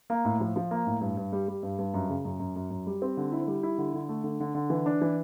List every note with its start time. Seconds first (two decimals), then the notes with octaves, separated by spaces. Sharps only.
0.10 A#3
0.25 A2
0.40 F3
0.56 F3
0.71 A#3
0.86 A2
1.01 G2
1.17 G2
1.32 G3
1.48 G3
1.63 G2
1.79 G2
1.94 F#2
2.09 C#3
2.25 F#2
2.39 F#2
2.56 F#2
2.70 F#2
2.86 G3
3.02 C4
3.17 D3
3.32 E4
3.47 G3
3.63 E4
3.78 D3
3.94 D3
4.09 A3
4.24 D3
4.40 D3
4.55 D3
4.70 E3
4.86 D4
5.02 E3